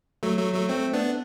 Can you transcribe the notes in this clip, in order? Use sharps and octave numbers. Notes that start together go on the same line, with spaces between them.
F#3 A3
F#3 A3
F#3 A3
A3 C4
B3 D4